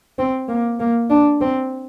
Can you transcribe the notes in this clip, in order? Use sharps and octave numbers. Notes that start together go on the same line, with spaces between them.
C4
A#3
A#3
D4
C4